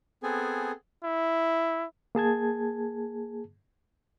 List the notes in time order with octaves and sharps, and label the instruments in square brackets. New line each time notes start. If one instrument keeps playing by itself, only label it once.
[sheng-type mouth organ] B3 C4 G#4 A4 G#5
[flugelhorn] E4
[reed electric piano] A#3 G#4 A5 G#6